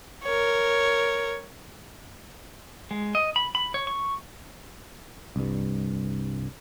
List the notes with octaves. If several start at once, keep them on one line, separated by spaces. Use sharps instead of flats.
A#4 C#5
G#3
D#5
B5
B5
C#5
C#6
C2 G2